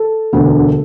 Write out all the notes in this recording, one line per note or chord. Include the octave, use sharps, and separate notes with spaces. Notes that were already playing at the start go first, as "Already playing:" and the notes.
Already playing: A4
E1 D2 D3